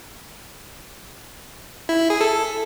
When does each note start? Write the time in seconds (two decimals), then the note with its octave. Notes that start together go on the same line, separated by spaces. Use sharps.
1.89 E4
2.00 E4
2.10 G#4
2.21 A4